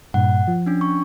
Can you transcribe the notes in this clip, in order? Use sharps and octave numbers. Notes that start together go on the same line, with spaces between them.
G2 A#2 F#5
F3
C#4 D4
C#6